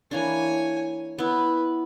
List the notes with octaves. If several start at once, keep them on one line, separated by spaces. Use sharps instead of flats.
E3 A#3 D4 C#5 G#5
B3 E4 B4